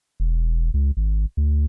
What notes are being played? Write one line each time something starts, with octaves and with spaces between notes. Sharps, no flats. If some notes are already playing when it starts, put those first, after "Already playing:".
E1
C#2
G#1
D2